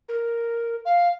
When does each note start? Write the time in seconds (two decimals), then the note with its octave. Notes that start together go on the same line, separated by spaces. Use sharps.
0.09 A#4
0.85 F5